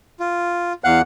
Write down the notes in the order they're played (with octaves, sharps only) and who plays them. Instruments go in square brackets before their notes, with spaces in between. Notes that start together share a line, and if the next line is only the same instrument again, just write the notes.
[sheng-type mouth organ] F4
[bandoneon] E2 F#5 F#6 [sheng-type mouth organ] F5